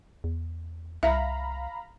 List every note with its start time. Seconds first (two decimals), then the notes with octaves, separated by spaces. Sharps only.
0.24 E2
1.03 C2 E5 F5 A#5 B5